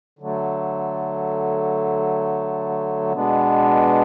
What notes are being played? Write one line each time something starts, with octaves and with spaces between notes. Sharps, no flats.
D3 F#3 A3
B2 G#3 B3 D4